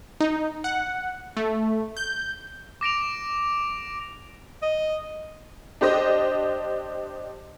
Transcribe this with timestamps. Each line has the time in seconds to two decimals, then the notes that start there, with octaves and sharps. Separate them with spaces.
0.20 D#4
0.64 F#5
1.37 A3
1.97 G6
2.81 D6 A#6 D7 F7
4.63 D#5
5.81 D4 G4 C5 D#5